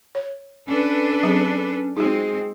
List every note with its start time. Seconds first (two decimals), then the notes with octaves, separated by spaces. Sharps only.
0.15 C#5
0.67 C#4 D4 A4 B4
1.23 F#3 C4 G#4
1.97 G#3 C4 D#4 F4 F#4 G#4